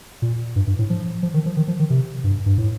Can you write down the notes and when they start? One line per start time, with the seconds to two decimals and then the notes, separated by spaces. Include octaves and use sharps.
0.22 A#2
0.56 G2
0.67 G2
0.79 A2
0.90 F3
1.23 F3
1.34 D#3
1.46 F3
1.57 D#3
1.68 F3
1.79 D#3
1.90 C3
2.24 G2
2.46 G2
2.58 A2